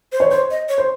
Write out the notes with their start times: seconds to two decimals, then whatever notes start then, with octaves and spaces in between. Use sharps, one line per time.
0.12 C5
0.20 C#5
0.31 C5 C#5
0.50 D#5
0.69 C#5
0.78 C5